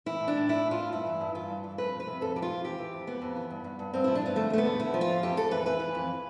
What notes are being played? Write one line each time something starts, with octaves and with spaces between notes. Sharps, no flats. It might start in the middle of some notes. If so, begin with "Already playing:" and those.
E3 E4
A2
D4
A2
A2 E4
A2
F4
A2
G2 E4
E3
G2
E3 F4
G2
E3
F2 B4
F3
B4
C3
F2 A4
F3 G4
F4
F2
E3 G4
E3
F2
F2 B3
F2
E3
G2
G2
G2
G2 C4
F3 E4
D4
F3 B3
D3 A3
E2 A3
B3
D3
D3 E4
F3
F4
E2
F2 G4
F2 A4
E3 B4
E3 B4
E3
F2